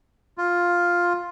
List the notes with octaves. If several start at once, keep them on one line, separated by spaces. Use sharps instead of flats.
F4